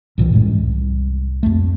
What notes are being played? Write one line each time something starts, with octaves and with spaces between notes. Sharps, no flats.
C2 A#2 D#3 E3
F#2 A2 G#3
C2
F2 A3